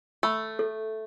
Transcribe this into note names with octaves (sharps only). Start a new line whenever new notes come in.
A3 B5
A4